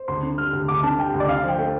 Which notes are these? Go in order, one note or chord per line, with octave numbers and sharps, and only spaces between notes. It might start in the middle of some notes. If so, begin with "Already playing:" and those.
Already playing: C5
D2 C6
D3
G3 F6
D2
D2 D6
D3 A5
G3 G5
D2
D5
D3 F5
F3 G5
A3